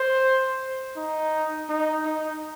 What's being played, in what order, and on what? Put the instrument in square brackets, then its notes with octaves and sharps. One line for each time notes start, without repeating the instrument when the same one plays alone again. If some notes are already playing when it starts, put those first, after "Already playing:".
Already playing: [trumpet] C5
D#4
D#4
D#4